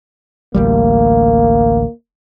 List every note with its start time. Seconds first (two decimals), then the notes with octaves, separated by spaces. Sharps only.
0.54 A1 D2 G3 A#3